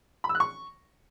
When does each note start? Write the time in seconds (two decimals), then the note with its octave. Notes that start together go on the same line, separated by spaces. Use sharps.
0.24 B5
0.29 E6
0.35 F#6
0.40 C#6